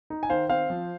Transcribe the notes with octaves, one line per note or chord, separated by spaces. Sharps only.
D#4
G#5
D#3 C5 F5
C4 C5 F5
F3